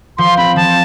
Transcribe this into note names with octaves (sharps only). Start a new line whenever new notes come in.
F3 C6
C4 B5
F3 A5